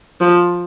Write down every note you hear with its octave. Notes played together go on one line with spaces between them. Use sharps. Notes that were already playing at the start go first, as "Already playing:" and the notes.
F3